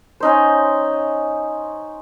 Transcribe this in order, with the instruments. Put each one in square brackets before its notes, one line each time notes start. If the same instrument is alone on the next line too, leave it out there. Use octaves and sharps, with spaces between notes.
[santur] C#4 D#4 C5